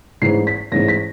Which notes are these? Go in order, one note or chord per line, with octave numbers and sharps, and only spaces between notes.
A1 G#2 E3 C7
B6
A1 G#2 E3 A#6
B6